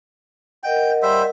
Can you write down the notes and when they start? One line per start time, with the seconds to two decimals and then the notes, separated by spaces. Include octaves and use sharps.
0.63 A#4 D#5 F#5 G5
1.02 G3 C5 E5